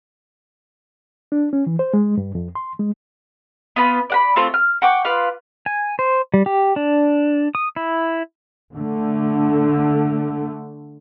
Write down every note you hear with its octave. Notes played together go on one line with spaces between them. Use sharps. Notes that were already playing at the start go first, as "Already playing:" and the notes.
D4
C#4
E3
C5
G#3
G2
F2
C6
G#3
B3 F4 B5
D5 F#5 B5
A3 C4 F4
F6
F#5 G5 C#6 D6
F4 B4 F5 D6
G#5
C5
G3
G4
D4
D#6
E4
D3 A3